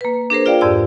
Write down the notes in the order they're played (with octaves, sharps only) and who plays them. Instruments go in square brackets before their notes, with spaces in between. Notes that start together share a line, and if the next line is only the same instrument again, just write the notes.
[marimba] A#3 B4
D4 G#4 A#4 C5
F4 G#4 D5 F5 G5
F2 G#2 G4 D5 E6